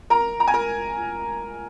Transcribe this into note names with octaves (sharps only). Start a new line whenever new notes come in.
A#4 A#5
A#5
G#5
A#4 A#5